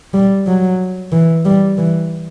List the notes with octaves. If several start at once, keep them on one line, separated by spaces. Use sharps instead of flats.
G3
F#3
E3
G3
E3